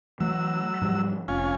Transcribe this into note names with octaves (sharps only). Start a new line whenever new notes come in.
E3 F#3 A3 E6
G#2 F3 G3
F1 C#4 F4 G#5